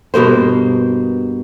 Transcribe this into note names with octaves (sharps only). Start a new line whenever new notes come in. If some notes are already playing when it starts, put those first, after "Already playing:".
G2 B2 A#3 C5